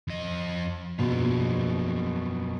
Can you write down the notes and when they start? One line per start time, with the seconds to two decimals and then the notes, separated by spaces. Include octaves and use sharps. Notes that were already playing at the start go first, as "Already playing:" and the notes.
0.08 F2 D#5
0.99 A#1 F#2 B2 F3